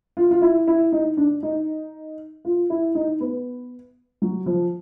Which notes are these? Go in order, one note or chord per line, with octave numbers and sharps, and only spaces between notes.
F4
F4
E4
E4
D#4
D4
D#4
F4
E4
D#4
B3
F#3
F3